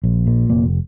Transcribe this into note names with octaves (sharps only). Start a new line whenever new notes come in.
A#1
A#2
F1 A#3